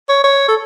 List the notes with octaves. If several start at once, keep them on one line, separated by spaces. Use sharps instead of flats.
C#5
C#5
A4